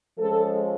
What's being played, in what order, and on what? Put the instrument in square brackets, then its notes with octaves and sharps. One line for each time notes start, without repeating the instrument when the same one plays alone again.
[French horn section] F3 G#3 C#4 A4